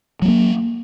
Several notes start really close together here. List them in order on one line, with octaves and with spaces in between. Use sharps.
F#3 G#3 A#3